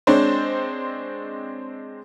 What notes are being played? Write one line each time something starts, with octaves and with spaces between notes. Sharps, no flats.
G#3 C4 D4 C5 C#5